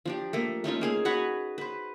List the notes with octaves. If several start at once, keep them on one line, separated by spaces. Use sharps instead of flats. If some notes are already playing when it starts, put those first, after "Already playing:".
F3 D4 G4
A3 A#3
A3 C#4 D#4 F4
A#3 G#4 F5
F#4 B4 C#5 F#5
B4 C5